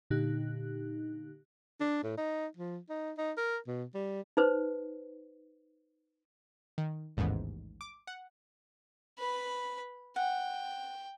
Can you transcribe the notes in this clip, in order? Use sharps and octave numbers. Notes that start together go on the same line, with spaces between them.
A#2 D3 D#4 G4 F#6
D4
A2
D#4
F3
D#4
D#4
A#4
B2
G3
D#4 B4 C5
D#3
A1 D#2 G#2 C#3 B3
D6
F#5
B4 B5
F#5 G5